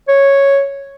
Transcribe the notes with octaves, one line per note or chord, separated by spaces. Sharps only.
C#5